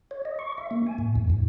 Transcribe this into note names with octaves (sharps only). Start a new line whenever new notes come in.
C#5
D#5
C#6
E5
A#3
G#5
A2
E2
G#2